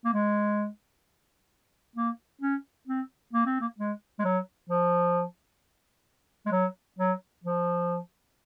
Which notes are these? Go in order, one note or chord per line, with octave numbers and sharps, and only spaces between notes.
A#3
G#3
A#3
C#4
C4
A#3
C4
A#3
G#3
G#3
F#3
F3
G#3
F#3
F#3
F3